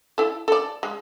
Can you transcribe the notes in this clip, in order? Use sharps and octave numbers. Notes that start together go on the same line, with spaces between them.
E4 A4
A4 D5
G#3